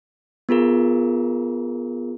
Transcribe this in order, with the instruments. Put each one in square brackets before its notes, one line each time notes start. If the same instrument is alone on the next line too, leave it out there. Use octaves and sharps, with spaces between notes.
[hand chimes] B3 F4 G#4 A#4